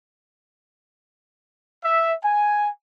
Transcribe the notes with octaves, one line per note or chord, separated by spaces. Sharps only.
E5
G#5